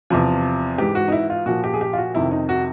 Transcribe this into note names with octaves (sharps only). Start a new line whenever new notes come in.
E2 C3 F3
G#2 E3 G4
F#4
D#4
E4
F4
A#2 F3 F#4
G4
G#4
G4
F4
F#4
F2 C3 D#3 E4
D#4
F#4